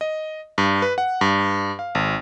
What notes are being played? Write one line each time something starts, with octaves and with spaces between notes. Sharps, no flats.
D#5
G2
B4
F#5
G2
F5
G#1